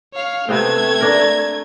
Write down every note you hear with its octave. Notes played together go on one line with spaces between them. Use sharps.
C#5 F5
C3 A3 B3 C4 G#6
D4 A#4